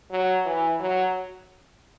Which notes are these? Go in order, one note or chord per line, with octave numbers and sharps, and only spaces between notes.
F#3
E3
F#3